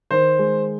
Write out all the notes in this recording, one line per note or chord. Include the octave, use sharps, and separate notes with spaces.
D#3 C5
G#3